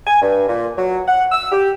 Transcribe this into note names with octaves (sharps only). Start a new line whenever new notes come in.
G#5
G2
A#2
F#3
F#5
E6
G4